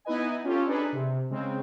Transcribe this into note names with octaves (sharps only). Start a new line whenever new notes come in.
B3 D#4 E4 B4 D#5 G#5
C#4 F4 G4 A4
D4 D#4 G#4 A4 B4
C3
C#3 G#3 C4